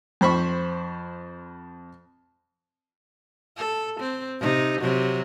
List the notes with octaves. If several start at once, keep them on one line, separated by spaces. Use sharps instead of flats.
F2 C5 B5 C#6
A4
C4
C3 D#4
C3 F#3